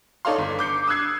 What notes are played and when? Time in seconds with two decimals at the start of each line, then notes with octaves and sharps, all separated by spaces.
0.25 D#4 A4 C#5 D5 F5 C6
0.38 G1
0.59 D6 G6 C7 C#7
0.87 D#6 E6 F#6 G#6 C7